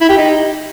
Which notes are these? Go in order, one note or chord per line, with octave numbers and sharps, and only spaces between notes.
E4
G4
D#4